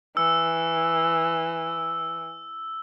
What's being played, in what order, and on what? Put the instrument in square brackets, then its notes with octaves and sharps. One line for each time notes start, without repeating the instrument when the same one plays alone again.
[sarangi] E3 [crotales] E6